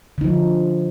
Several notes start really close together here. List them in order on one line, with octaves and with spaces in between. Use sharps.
D3 D#4 F3